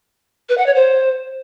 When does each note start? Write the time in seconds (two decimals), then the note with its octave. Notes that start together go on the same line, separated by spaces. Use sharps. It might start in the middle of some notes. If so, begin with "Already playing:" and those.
0.49 B4
0.58 F#5
0.66 C#5
0.75 C5